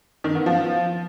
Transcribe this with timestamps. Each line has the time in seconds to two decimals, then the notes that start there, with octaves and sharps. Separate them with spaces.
0.24 D#3
0.35 B3
0.46 F3